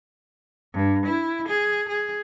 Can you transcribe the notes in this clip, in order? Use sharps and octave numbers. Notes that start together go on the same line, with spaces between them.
G2
E4
G#4
G#4